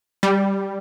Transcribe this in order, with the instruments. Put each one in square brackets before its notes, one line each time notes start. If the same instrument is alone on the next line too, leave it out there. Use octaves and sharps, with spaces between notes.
[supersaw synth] G3